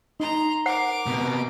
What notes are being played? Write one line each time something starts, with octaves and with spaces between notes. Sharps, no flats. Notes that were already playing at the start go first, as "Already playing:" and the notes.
D#4 A#5 C6
A#4 C5 F#5 D6
C3 B3